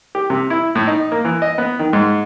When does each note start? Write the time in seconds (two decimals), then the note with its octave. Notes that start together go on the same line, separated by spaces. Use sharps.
0.15 G4
0.30 C3
0.50 E4
0.75 A2
0.87 D#4
1.12 A#3
1.25 E3
1.42 D#5
1.58 B3
1.79 D#3
1.93 G#2